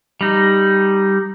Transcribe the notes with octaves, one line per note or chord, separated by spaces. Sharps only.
G3 D#4